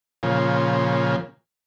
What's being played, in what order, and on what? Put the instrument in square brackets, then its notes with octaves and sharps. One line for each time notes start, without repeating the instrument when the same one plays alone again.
[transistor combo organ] A#2 C#3 F3